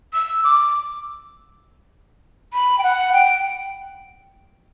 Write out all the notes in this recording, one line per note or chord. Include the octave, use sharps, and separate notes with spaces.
E6
D6
B5
G5
F#5
G5